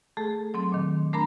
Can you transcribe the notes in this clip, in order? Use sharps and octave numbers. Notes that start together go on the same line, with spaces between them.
A3 G#4 A4
F#3 C4 C6
A#2 D#3
A3 D4 A#4 A#5 B5